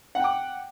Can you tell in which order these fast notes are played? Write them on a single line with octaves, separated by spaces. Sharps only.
F#5 G5 D6